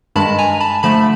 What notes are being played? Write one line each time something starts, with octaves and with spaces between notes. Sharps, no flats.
G2 D#3 G#3 A5 B5
G#5 A#5
A5 B5
D3 F3 A3 A5 B5